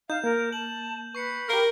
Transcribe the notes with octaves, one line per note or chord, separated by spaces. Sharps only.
D#4 F5 G6 E7
A#3 A#4
A5 F#7
B4 C#6 C7 C#7
G4 A#4 B5